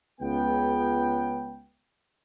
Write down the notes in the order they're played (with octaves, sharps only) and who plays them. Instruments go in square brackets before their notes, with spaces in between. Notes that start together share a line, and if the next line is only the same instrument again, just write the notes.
[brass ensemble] C#2 B3 G5